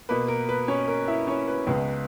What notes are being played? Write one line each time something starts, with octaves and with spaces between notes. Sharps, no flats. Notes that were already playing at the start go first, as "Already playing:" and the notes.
B2 A#3 B4
A#4
B4
C#4 C#5
A#4
E4 E5
C#4 C#5
B4
C#2 C#3 G#3 B3